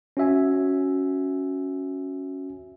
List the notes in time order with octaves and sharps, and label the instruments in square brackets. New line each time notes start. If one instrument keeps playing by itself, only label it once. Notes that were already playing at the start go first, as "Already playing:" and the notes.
[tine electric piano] C#4 F#4 E5 G#5